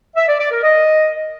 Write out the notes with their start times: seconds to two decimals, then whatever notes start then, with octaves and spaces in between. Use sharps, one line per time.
0.16 E5
0.28 D5
0.40 D5
0.51 A#4
0.63 D#5